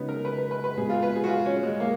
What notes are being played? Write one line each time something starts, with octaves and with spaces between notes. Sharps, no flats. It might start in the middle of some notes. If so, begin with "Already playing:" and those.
Already playing: C#3 G#3 B3 C#4 D#4 F#4
A#4
B4
B4
B4
B4
A#2 G#3 B3 F#4 G#4
F4
B4
G#4
F#4
F4
C#4
G#3
A#3